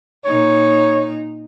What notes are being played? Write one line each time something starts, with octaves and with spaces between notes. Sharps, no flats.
A#2 D#4 C#5